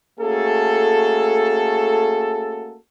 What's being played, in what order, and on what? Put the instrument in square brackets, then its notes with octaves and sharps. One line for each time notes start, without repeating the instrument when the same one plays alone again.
[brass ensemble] A3 A#3 C#4 F#4 G#4 A4